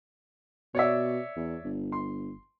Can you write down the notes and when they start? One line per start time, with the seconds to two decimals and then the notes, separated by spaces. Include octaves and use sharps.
0.75 B2 C#5 D5 E5
1.36 E2
1.64 G1
1.92 C6